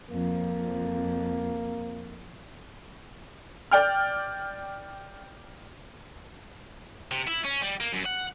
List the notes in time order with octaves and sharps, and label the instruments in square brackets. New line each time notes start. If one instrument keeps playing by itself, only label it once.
[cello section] F2 [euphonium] A#3
[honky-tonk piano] D5 G5 F6
[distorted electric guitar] C3
E4
C#4
G3
A#3
F#2
F#5